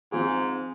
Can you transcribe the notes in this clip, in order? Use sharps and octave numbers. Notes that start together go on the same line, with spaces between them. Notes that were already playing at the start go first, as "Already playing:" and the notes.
G#2 F3 C4 F4 G#4